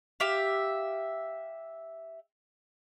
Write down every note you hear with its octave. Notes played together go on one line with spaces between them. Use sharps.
G4 E5 F5